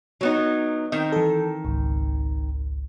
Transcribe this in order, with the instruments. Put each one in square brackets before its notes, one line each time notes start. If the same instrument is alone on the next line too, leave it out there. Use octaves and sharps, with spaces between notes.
[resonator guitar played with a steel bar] F#3 B3 D#4
[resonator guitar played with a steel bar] D#3 C4 [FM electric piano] D#5
[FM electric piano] E3 A4
G#1 C#2